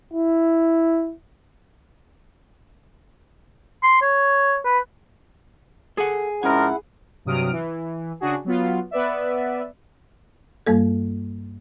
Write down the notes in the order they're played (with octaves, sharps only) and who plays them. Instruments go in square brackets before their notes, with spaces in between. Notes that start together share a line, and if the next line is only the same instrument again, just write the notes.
[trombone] E4
[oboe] C6
C#5
B4
[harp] G#4 [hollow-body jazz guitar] A4 F#5
[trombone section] F2 F3 A#4 [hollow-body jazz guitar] G#2 C#4 G#5 [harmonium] E4 F#5
[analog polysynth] G2 C3 F#3 D#6 F6 D7
E3
C#3 D4 F#4 G#4
F#3 B3 F4
B3 B4 D5 E5
[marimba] G2 G3 A#3 A4